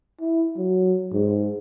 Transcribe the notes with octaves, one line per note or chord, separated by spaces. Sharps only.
E4
F#3
G#2